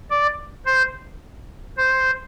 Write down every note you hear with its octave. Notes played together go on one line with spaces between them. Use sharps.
D5
C5
C5